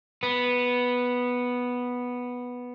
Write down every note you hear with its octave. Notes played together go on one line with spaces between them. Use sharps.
B3